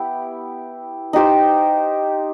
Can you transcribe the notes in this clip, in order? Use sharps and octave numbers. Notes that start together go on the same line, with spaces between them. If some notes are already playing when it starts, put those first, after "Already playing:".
Already playing: B3 E4 G4
D#4 G4 C5